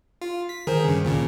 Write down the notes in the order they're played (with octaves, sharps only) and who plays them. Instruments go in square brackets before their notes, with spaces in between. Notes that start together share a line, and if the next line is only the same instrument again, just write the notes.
[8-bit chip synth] F4
B6
[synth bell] D#3 C5 [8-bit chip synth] G#4 A#4
[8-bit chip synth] G2 C#3
D2 A#2 C#3